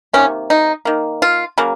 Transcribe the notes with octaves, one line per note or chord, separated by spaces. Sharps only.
C3 D#3 A#3 C#4
D#4
D#3 A#3
F4
C#3 F#3 A#3